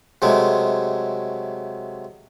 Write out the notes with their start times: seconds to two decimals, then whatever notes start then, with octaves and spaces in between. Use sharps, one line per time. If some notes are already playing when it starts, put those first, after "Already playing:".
0.22 C3 F#3 G#3 A3